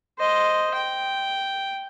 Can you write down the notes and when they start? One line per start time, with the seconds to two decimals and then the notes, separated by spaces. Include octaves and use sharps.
0.19 C5 D#5
0.75 G5